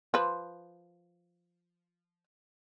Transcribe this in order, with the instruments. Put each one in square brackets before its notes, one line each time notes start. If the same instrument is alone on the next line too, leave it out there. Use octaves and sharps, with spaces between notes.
[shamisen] F3 B4